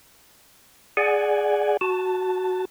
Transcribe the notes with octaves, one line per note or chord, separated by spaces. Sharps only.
G#4 D5 F#5 G#5
F#4 A5